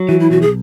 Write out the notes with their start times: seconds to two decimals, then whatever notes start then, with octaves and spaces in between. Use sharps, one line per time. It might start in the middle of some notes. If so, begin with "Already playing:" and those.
Already playing: F#3
0.09 E3 F#4
0.20 E4
0.30 B1 F#4
0.42 G#4